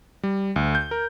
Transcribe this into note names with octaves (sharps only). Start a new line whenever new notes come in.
G3
D2
G6
A#4